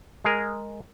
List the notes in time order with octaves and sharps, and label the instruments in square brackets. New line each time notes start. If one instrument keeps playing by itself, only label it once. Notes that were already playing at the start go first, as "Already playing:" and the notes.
[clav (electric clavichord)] G#3 G#4 A#4